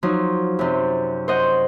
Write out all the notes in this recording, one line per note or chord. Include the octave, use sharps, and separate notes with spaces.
F3 F#3 D#4
F#2 C3
C5 D#5 F#5